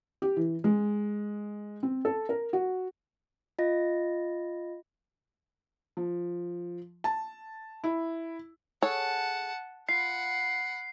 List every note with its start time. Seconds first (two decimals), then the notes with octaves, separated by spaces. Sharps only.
0.22 G4
0.37 E3
0.64 G#3
1.83 C4
2.05 A4
2.29 A#4
2.53 F#4
3.59 F4 D#5 A#6
5.97 F3
7.04 A5
7.84 E4
8.83 G#4 A4 C#5 F#5 A5
9.89 F4 F#5 B5 C7